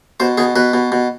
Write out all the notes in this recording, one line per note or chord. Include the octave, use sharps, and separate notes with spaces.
B2 C5
B2 G#4
B2 B4
B2
B2